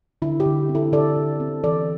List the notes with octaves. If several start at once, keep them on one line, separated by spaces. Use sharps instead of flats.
D3 E4
G4
D3
C4
E4 A4
D3 A4 D5
D3
C4
E3 A4 D5